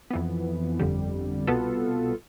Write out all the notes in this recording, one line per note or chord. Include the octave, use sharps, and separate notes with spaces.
F2 E3 B3
G1 F2 D3 G3
C2 B2 B3 F4 A4